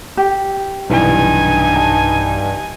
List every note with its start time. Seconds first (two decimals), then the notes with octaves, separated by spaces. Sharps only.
0.17 G4
0.90 B1 G2 C3 E3 D#4 G#5
1.76 A5